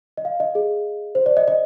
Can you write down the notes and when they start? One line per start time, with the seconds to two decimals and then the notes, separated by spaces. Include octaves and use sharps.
0.17 D#5
0.25 F5
0.40 D#5
0.55 G#4
1.15 C5
1.26 D5
1.37 D#5
1.48 D#5